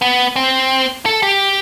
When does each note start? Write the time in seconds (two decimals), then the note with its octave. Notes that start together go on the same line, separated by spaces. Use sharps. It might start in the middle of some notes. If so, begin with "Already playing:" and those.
0.02 B3
0.36 C4
1.06 A4
1.23 G4